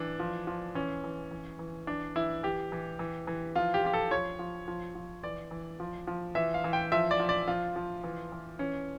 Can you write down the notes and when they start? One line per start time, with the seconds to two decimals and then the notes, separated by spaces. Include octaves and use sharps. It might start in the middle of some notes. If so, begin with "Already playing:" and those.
Already playing: E3 D4
0.19 F3
0.47 F3
0.75 E3 C#4
1.04 E3
1.31 E3
1.59 E3
1.87 E3 D4
2.16 E3 E4
2.43 E3 G4
2.72 E3
2.99 E3
3.27 E3
3.56 F3 F4
3.74 G4
3.84 F3 G4
3.93 A4
4.11 F3 C#5
4.39 F3
4.68 F3
4.95 F3
5.24 E3 D5
5.51 E3
5.80 F3
6.07 F3
6.35 E3 E5
6.54 F5
6.64 E3
6.73 G5
6.92 F3 E5
7.11 D5
7.19 F3
7.29 D5
7.47 F3 F4
7.76 F3
8.04 E3
8.32 E3
8.59 E3 C#4